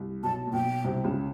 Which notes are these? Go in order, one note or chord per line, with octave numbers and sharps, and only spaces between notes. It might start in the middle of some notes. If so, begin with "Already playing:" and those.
Already playing: C2
B1 B2 A5
A#2
B1 B2 G5
C2 C3
C#2 C#3